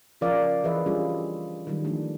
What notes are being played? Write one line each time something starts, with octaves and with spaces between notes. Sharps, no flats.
C#3 F3 A#4 D5 F5
E3 G#4 B4 D#5 E5
G3 C#4 D4 F4 G#4
D#3 F#3 G3
F3 A3 D4